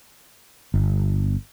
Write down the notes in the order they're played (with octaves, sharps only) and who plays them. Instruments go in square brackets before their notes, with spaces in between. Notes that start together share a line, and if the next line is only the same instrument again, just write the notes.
[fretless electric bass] G1